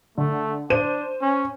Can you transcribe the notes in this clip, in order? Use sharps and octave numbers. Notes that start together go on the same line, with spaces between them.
D3 A3
D4 C5 D#7
C#4